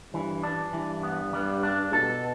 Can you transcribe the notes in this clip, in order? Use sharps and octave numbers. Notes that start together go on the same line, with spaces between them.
G2 E3
D4
G2 E3
B3
G3
D4
B2 A4